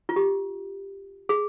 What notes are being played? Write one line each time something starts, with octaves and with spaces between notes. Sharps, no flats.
F4
G4
G#4